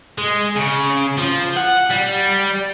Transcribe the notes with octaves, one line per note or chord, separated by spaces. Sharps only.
G#3
C#3
F3
F#5
G3